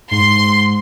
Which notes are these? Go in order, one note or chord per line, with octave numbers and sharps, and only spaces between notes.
G#2 C6